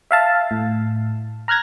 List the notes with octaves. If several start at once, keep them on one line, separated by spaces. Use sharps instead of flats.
E5 F5 A5
A2
A#5 F6 F#6 G#6 A#6